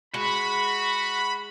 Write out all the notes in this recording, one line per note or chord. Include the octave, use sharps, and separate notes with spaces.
G#3 F#4 B5